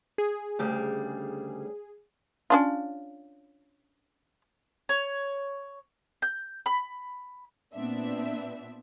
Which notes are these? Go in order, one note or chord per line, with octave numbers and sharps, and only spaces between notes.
G#4
D2 C#3 G3
C#4 D4 F4
C#5
G6
B5
A#2 B3 C4 D4 E5